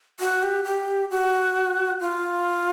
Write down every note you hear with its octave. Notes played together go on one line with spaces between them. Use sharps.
F#4
G4
G4
F#4
F4